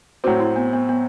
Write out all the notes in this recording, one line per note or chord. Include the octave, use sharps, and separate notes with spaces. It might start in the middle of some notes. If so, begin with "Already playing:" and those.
A2 F#3 C4 F#4
E4
B3
B3
B3